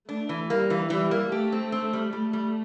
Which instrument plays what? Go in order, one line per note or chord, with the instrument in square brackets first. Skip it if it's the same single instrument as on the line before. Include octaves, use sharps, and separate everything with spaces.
[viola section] A3 [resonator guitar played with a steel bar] D4
[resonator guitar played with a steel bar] E3
[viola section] G3 [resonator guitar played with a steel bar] A#3
[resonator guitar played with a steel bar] E3
[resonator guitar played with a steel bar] E3 [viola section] G3
[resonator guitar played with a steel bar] A#3
[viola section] A3 [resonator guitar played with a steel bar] G4
[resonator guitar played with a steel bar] C4
C4
G3
[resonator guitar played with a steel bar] G3 [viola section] A3
[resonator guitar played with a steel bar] G3